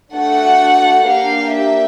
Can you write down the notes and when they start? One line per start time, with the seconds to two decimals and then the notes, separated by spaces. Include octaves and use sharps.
0.14 A3 D4 F#4 A4 F#5
1.06 A#3 D4 G4 F5
1.52 E5